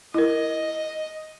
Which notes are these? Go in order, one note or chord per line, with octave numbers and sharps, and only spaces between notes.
E4 A#4 D#5